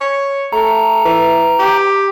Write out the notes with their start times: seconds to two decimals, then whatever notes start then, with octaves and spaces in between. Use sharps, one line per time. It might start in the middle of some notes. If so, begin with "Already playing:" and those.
0.01 C#5
0.53 A3 A#5
1.05 E3
1.59 G4